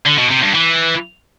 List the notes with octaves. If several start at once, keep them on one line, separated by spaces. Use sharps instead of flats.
D3
B2
C3
G2
E3